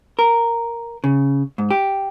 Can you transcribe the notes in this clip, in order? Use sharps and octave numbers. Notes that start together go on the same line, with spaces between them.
A#4
C#3
G#2
G4